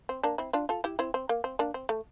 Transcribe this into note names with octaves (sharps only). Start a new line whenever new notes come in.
C4
A#3 D4
C4 E4
D4 F4
F4 A4
E4 G4
C4 E4
C4
A#3
C4
A#3 D4
C4
A3